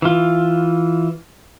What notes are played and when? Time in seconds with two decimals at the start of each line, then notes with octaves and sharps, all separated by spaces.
0.02 E3 F4